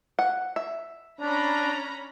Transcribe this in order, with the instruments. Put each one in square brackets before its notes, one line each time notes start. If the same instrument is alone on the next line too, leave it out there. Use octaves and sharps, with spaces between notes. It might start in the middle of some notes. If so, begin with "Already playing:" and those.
[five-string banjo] F#5
E5
[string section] C#4 A#5 B5 [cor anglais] D4